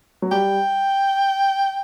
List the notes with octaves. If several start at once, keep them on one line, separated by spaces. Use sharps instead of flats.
F#3
G3 G5